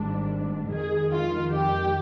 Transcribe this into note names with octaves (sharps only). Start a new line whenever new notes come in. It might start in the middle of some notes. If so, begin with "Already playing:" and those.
Already playing: G#1 G#2 G3 D4
F2 D#3 G#3 G#4
F4
G4